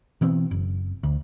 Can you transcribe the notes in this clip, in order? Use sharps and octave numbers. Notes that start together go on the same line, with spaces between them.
B2 E3 B3 C4
F#1
D2